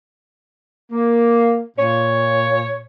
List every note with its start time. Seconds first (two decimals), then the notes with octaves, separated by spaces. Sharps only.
0.92 A#3
1.77 A#2 C#5